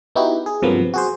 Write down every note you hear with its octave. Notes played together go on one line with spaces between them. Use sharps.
B3 D#4 E4 F#4 G4
G#4
G2 C3 F3 F#3 A#3 B3
F#4 G#4 C5